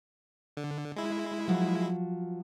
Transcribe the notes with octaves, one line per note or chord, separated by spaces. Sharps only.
D3
G#3 E4
F3 F#3